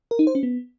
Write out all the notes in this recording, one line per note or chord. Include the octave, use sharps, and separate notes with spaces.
A#4
D#4
C5
C#4
B3